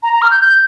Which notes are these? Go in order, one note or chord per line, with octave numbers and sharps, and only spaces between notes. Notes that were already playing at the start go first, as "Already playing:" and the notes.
A#5
A#5
F6
G6
G6